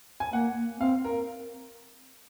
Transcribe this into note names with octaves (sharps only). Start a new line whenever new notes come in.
G#5
A#3 F#5
C4 F5
A#4